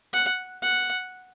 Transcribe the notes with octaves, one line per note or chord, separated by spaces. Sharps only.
F#5
F#5